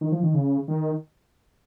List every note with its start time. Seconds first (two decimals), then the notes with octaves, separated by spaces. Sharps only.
0.01 D#3
0.12 F3
0.23 D#3
0.34 C#3
0.68 D#3